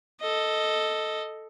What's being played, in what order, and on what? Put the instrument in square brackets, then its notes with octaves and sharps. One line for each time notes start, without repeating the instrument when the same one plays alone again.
[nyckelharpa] A4 D#5